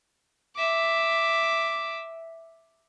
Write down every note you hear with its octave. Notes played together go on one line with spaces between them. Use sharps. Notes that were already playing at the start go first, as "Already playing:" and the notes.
E5 D6